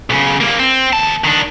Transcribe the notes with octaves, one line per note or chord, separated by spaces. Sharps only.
B1 C#3
G3 A#3
C4
D#2 A5
D#3 D4